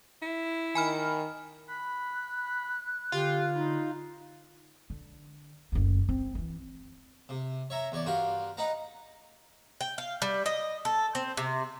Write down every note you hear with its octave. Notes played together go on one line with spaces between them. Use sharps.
E4
D#3 G#5 B5 F6
B5 F#6
D3 F4 G4
D#4 B5
D3
F#1 D2
C4
E3 E4
C3
C#5 E5 A#5
E2 C#5 D5
G2 F4 F#4 A#4 G5
D#4 B4 F#5 A#5
G5
F5
G3
D#5
A4
C4
C3